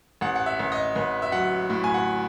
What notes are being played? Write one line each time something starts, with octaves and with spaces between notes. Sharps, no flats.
A1 F#5
F#5
E5
A1
D#5
A1 B4
E5
F#3 F#5
A2
G#5
F#5